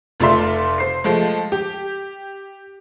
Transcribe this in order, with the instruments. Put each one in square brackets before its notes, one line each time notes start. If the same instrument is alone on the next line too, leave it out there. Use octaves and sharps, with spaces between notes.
[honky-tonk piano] F1 A3 F4 D5 E5 C6
C5 C7
F3 G#3 A3
G4